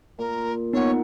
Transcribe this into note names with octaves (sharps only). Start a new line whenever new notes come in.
A#2 A#4
B3 D#4 C#5 F#5